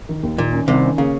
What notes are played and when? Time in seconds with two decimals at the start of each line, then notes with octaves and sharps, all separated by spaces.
0.09 D#3
0.23 D#2
0.38 A#2 D#3
0.53 C#4
0.68 C2 C3 D#3
0.83 C#4
0.98 C#3 A#3